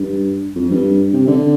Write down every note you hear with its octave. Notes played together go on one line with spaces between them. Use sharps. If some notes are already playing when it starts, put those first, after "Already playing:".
Already playing: G2
F2
G2
C3
D3